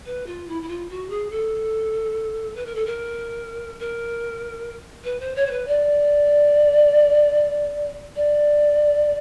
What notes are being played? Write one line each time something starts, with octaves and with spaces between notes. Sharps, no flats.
B4
F4
E4
E4
F4
F#4
G#4
A4
B4
A#4
A4
A#4
A#4
B4
C5
C#5
C5
B4
D5
D5